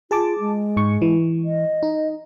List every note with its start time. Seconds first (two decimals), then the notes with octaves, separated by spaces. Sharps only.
0.11 F4 G#4 A5 D6
0.39 G#3
0.77 G#2 C#6
1.02 E3
1.45 D#5
1.83 D#4